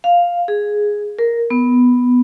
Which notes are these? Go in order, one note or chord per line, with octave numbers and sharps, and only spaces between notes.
F5
G#4
A#4
B3